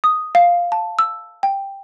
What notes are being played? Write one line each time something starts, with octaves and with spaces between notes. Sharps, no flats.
D#6
F5
A5
E6
G5